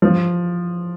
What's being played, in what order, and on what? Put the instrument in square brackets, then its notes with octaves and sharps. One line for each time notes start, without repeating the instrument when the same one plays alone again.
[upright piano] F3